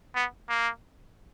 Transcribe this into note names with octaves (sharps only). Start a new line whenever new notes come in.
B3
A#3